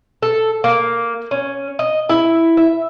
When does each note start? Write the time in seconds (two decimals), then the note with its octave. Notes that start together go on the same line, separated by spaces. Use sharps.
0.22 A4
0.64 A#3
1.31 C#4
1.79 D#5
2.09 E4
2.57 E5